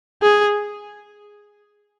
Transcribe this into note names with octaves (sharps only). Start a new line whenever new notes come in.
G#4